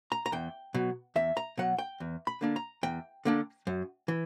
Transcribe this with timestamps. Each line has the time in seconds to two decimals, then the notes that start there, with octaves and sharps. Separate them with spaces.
0.12 A#5
0.26 A#5
0.32 E2 G5
0.74 B2 F#3
1.16 E2 E5
1.37 A#5
1.58 B2 F#3 F#5
1.78 G5
2.00 E2
2.27 B5
2.41 D3 A#3 D4
2.56 A#5
2.83 E2 G5
3.25 D3 A#3 D4
3.67 F#2
4.08 E3